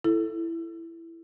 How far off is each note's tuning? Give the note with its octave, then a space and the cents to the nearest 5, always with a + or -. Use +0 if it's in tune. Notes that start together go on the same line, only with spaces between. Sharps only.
E4 +10 A4 +0